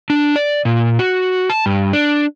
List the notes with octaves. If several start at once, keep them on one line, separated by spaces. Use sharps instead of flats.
D4
D5
A#2
F#4
A5
G2
D4